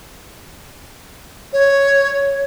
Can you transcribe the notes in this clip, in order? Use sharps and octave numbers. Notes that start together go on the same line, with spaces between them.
C#5